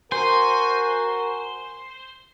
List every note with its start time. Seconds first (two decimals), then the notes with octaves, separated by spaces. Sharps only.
0.12 F#4 A#4 C5 G#5